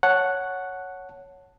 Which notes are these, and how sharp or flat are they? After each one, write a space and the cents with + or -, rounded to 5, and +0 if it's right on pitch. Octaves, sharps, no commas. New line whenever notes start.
C#5 +0 F#5 +0 A5 +0